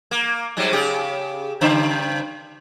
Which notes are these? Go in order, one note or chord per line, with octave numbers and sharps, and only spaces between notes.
A#3
G#2 F#3 G3
C#3 G4
G2 C#3 C5